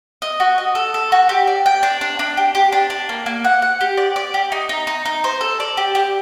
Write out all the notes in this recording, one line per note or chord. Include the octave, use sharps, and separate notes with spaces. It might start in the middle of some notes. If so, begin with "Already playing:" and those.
D#5
F#4
D#5
A4
A4
F#4
G4
D5
G5
D4
D4
D4
G4
G4
D4
D4
A#3
A#3
F#5
F#5
G4
D5
D5
G4
D#4
D#4
D#4
D#4
C5
A4
D5
G4
G4